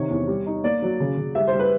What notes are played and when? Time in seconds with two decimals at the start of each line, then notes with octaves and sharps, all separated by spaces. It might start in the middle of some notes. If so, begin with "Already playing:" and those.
Already playing: C3 D#3 C#5
0.10 E2
0.27 G3
0.46 D#4
0.64 A#3 D5
0.82 F#3
1.00 C#3
1.17 C#3
1.35 G3 E5
1.47 C5
1.53 G3
1.59 B4